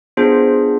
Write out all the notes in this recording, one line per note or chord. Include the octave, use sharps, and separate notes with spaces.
B3 D4 F4 G#4 C5